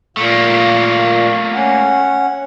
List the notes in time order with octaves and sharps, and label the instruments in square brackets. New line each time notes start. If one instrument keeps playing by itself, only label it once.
[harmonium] A#2 [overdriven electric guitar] A3 A#3
[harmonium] C#4 F#5